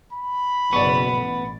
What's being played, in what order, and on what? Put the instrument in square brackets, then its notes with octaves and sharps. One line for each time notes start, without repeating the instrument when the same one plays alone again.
[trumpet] B5
[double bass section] F#1 B2 [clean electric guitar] B3 [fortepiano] D5 C#6
[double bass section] A1